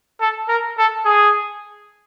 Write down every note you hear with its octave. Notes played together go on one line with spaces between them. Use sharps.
A4
A#4
A4
G#4